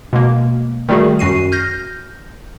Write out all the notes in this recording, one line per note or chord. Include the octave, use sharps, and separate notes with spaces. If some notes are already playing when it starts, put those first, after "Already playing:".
B2 G#3 A#3
D#3 G3 A3 F#4 G#4
F#2 F#4 C7 D#7
F6 G6 A#6